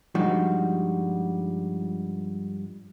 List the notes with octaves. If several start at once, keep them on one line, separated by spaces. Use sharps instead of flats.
G2 F3 G3 G#3 D#4 F#4